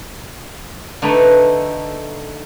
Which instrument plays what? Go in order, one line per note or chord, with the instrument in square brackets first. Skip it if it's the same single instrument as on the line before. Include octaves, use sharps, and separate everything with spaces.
[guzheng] D3 A3 D#4 B4